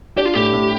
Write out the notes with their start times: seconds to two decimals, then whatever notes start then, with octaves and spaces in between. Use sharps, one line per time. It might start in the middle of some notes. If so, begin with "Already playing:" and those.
0.17 D4 G4
0.25 F4
0.34 A2 G4
0.53 A2